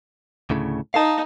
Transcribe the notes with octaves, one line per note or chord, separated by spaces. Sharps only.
D2 A2 C#3
D#4 F5 A5